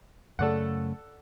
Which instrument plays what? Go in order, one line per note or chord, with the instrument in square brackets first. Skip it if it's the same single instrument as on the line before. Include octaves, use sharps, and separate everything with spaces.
[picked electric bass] F#2 C#3 A3 [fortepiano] A4 D5 F#5